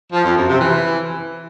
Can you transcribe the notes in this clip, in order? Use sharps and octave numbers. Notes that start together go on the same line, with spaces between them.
F3
F2
F#2
C3
E3